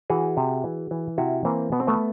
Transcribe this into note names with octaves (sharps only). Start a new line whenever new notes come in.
E3 F#4 G#4
C3
E3
E3
C3 E4 F#4
E3 A#3 C4
B2 B3
C4
A3 B3